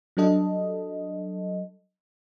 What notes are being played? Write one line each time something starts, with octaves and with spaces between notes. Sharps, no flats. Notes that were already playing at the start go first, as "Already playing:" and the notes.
F#3 G3 D4 A4 D#5